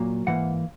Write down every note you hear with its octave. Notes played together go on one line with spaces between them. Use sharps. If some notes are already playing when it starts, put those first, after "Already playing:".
Already playing: A#2 F#3 A#3
G#2 E3 A#3 F#5